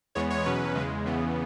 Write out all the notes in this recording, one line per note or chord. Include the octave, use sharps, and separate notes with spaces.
E2 E3 G#3 B3 C#5
C#5
E2 B2 F#3 C#4 B4
E2 C#3 G#3
E2 C#3 E3 B3